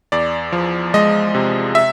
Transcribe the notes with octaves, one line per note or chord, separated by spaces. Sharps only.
E2 D5
F3
G#3 D#5
C3
E5